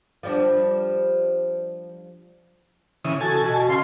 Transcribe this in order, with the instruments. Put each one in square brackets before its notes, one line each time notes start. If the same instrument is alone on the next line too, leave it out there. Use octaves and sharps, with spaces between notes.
[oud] F3 G3 D4
[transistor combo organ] C#3 E3 D#6
[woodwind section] F#4 A4 [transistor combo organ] G#5 A5
[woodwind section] B2
[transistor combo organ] C#3 [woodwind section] F5 C6